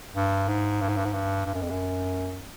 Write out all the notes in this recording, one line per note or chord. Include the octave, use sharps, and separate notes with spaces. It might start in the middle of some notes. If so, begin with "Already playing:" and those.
G2
G#2
G2
G#2
G2
G#2
G2
G2
F#2
F2
F#2